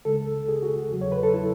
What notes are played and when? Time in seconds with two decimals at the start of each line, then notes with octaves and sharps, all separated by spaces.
0.05 C#2 C#3 G#3 A4
0.48 G#4
0.63 F#4
0.90 E2 C#3 F#3
1.01 C#5
1.12 B4
1.23 A4
1.34 E4